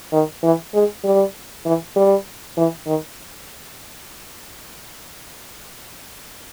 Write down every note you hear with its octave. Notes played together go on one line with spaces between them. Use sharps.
D#3
E3
G#3
G3
E3
G3
E3
D#3